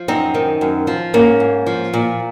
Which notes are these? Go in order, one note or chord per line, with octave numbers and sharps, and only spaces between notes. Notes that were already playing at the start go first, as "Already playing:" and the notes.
Already playing: F3
F#2 C4 D#4
D#3
F#2
F3
G#2 A#3 C#4
G#2
F3
A#2